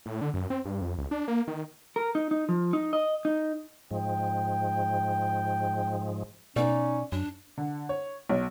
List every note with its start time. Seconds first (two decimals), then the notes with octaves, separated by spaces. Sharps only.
0.06 A2
0.21 D3
0.34 F#2
0.50 C4
0.65 G2
0.81 F2
0.98 C#2
1.11 D4
1.28 A#3
1.48 D#3
1.96 A#4
2.15 D#4
2.31 D#4
2.49 F3
2.73 D#4
2.93 D#5
3.25 D#4
3.91 G#2 F3 G#3 G5
6.56 B2 C#4 D#4 D5
7.12 F#2 D4
7.58 D3
7.89 C#5
8.29 B1